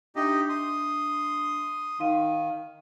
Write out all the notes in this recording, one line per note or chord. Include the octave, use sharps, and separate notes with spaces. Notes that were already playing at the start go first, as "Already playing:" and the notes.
D4 D#4 G4 D#5 E5
C6 D#6
D#3 D#4 F5 D#7